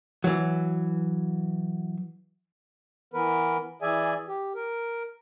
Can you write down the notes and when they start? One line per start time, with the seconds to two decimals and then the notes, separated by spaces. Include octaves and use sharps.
0.24 E3 F#3
3.14 E3 B3 A#4 B4
3.82 E3 G#4 D5 E5 G#5
4.28 G4
4.55 A#4